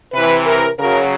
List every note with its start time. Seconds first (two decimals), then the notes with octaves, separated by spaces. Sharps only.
0.13 C3 E3 B4
0.46 A#4
0.78 C#3 F#3 A#4